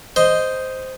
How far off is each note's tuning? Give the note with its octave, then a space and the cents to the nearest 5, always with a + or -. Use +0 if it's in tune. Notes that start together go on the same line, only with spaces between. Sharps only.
C5 -5 D#5 +0